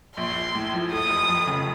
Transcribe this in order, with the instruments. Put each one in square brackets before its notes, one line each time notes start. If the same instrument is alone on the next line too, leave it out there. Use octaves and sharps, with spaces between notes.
[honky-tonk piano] A#1 [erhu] C6
[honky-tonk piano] A#1
A2
F3
[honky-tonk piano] A3 [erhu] D#6
[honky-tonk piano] F1
F2
C#3